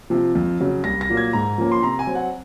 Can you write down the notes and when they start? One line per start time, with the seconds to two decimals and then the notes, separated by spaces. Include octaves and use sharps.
0.10 C3 F3
0.35 F2
0.60 C#3 F#3
0.84 C2 A#6
1.01 A#6
1.09 A#2 F#3 A#3
1.17 G#6
1.33 G#2 A#5
1.58 F3 A#3 C#4
1.72 C6
1.82 C3 A#5
1.99 G#5
2.07 F#3 C4
2.15 F#5